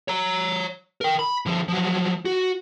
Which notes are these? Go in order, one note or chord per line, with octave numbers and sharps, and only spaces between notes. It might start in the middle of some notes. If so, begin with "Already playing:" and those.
C#5 A#5
A#4 G5
B5
D3 F3
F3 F#3
F#4